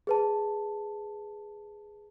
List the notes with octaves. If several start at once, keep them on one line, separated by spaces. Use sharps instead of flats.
G#4 B4 A5